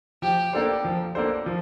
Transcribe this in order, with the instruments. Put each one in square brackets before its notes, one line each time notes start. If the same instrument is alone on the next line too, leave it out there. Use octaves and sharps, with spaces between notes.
[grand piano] F3 [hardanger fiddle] G4
[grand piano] A#3 D4 A4 C5
F3
A#3 D4 A4 C5
F3